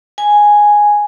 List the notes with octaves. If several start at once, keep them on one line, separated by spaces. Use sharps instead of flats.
G#5